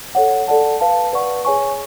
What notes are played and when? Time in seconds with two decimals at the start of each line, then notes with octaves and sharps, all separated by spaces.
0.15 A4 C#5 F#5
0.48 A4 D5 F#5 A5
0.81 B4 F5 A5
1.13 B4 D5 F#5 C#6
1.45 G#4 C#5 G#5 C#6